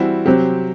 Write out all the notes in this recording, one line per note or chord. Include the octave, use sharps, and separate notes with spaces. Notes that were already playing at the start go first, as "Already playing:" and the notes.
Already playing: E3 G3 C4 E4 F#4
C3 F#3 C4 G4